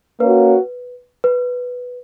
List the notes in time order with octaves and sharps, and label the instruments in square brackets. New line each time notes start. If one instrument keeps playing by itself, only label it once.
[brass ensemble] A#3 C#4 F#4 [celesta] B4
[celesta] B4